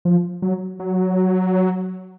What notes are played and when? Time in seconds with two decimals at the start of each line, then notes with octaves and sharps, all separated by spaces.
0.05 F3
0.42 F#3
0.80 F#3